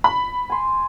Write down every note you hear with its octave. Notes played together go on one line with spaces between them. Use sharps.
B5
G#5 C6